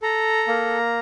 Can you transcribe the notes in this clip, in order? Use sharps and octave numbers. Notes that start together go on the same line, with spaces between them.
A4 A#5
A#3